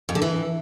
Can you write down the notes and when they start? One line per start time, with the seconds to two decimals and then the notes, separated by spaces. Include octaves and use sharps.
0.09 F2
0.15 D3
0.22 E3